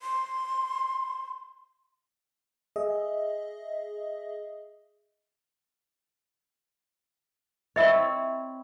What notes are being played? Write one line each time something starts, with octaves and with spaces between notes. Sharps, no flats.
C6
G#4 D#5 E5
C4 E4 C#5 D#5 E5